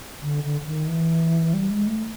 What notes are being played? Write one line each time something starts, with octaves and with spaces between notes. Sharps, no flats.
D3
D3
D3
D#3
E3
G3
G#3
A3